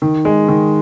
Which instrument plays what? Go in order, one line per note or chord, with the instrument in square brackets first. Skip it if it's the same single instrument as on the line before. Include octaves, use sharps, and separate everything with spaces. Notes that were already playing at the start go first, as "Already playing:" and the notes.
[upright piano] D#3
G#3
D#3